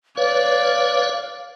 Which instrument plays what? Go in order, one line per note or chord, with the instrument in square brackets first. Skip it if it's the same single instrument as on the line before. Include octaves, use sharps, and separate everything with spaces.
[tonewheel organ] B4 C#5 [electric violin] D5 [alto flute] F5